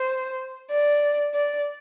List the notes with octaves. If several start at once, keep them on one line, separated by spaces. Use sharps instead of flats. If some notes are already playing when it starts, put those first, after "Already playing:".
Already playing: C5
D5
D5